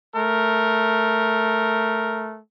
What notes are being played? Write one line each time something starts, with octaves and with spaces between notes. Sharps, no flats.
A3 A#4